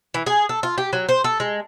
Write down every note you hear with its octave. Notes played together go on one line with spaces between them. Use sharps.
E3
G#4
A4
F4
G4
F#3
C5
A4
G#3